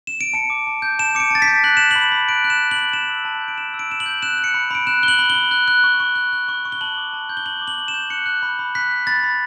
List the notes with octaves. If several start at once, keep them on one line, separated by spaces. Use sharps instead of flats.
E7
D7
A5 C#7
D6
A5
G6
A5 E7
D6 C#7 D7
A5 A6
B6
G6
F#6 F#7
F#6 E7
B5 F#7
B5
F#6 D7
F#6
E7
B5
B5 F#7
A5 E7
E6
A5
G6
D7
A5 E7
E6
D7
A5 E7
F#7
G6
F#6 E7
F#6
C#7
B5
B5 D7
F#6 E7
F#6 G7
F#7
B5
G7
B5
F#6
F#6
C#6
C#6
F#6
F#6
C#6
C#6
G7
A5 F#7
D6
A5
G6
G7
A5 F#7
D6
F#7
A5
E7
G6
F#6 C#7
F#6
B5
B5
F#6 B6
F#6
B5 A6
B5